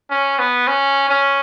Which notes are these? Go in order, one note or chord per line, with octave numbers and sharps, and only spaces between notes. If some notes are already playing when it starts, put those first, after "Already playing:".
C#4
B3
C#4
C#4